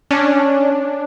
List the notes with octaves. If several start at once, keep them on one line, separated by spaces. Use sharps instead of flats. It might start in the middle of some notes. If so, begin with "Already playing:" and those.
C#4 D4